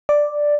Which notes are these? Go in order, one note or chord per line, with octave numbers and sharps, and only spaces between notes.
D5